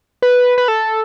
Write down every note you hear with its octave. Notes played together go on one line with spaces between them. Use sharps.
B4
B4
A4